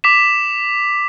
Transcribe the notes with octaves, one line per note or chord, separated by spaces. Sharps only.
D6 B6 E7